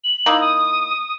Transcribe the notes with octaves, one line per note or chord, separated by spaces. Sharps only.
F#7
A#3 D#4 E4
D#6